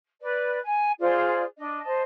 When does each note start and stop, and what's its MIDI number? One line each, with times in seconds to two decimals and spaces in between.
0.20 0.59 71
0.20 0.59 74
0.64 0.90 80
0.99 1.43 65
0.99 1.43 68
0.99 1.43 72
0.99 1.43 74
1.58 1.79 62
1.58 1.79 75
1.84 2.02 72
1.84 2.02 75
1.84 2.02 81